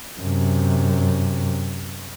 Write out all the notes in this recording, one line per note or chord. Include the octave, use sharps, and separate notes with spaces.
F#2 C3